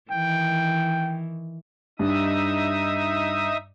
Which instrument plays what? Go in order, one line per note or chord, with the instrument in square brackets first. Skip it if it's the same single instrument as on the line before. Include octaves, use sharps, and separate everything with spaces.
[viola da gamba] D#3 E3 [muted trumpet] G5
[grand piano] G2 [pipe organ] D#4 E5 D#6